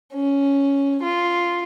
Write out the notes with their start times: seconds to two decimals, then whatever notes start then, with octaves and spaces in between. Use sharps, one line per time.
0.13 C#4
1.02 F4